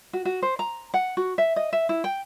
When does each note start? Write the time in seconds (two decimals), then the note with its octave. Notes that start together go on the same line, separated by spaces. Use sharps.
0.13 F#4
0.25 F#4
0.42 C5
0.59 A#5
0.94 F#5
1.17 F#4
1.38 E5
1.56 D#5
1.73 E5
1.89 E4
2.04 G5